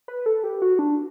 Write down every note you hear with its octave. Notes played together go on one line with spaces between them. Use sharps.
B4
A4
G4
F#4
D4